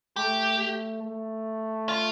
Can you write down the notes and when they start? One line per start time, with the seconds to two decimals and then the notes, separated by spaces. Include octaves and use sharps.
0.16 A3 G4
0.59 A3
1.03 A3
1.89 F4